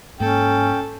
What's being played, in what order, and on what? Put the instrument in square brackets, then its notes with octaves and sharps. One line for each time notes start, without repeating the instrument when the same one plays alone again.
[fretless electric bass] G#2 A#3 [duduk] C#4 [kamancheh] A4 [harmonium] G5